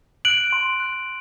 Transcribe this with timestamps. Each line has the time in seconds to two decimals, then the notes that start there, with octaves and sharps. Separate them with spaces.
0.25 F#6 D7 F#7
0.53 C6
0.80 F#6